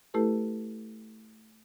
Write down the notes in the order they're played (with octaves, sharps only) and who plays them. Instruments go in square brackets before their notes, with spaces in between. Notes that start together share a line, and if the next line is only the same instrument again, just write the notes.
[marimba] A3 E4 G4 A4 B4